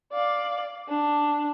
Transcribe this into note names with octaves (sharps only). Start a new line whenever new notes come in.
D5 F5
D4